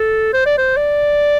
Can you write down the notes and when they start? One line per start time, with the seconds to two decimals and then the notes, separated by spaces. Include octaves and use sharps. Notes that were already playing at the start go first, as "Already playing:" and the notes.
Already playing: A4
0.33 C5
0.46 D5
0.58 C5
0.77 D5